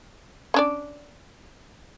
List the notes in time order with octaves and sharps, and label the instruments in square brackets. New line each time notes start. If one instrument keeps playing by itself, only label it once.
[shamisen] C#4 D4 D5